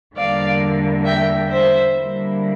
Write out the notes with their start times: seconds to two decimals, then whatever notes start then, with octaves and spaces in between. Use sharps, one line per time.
0.16 E2 D3 G3 A#3 D5 F5
1.05 E5 G5
1.50 C5 E5
1.95 D3 G3 A#3 E4